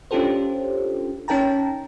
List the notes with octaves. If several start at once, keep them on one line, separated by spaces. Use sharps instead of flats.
C#4 D4 F4 G4 A4 C5
C#4 D#4 A#4 G5 A5 A#5